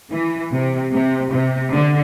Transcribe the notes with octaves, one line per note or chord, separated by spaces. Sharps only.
E3
C3
C3
C3
D3